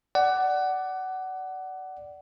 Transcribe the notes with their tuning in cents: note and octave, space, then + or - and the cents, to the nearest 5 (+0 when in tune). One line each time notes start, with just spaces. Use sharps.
D5 +0 F#5 +20